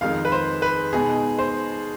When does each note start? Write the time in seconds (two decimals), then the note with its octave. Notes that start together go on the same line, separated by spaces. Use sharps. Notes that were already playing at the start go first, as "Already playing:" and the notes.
0.01 F2 D#3 G#3 F5
0.25 B4
0.32 C5
0.62 B4
0.93 B2 G#3 B3 D#4 G#4
1.38 C5